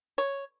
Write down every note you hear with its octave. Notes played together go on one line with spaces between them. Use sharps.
C#5